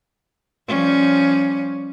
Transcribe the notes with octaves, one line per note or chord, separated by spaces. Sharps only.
F3 G3 C#4